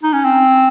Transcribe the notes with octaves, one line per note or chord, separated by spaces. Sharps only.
D#4
C#4
C4